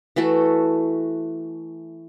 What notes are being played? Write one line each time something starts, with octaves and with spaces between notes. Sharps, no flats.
E3 A3 F#4 A4